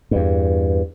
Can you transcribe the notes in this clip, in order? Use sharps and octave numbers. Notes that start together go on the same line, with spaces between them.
E2 G2